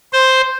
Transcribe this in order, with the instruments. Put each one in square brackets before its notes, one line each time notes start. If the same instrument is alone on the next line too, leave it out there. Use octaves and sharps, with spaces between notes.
[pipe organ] C5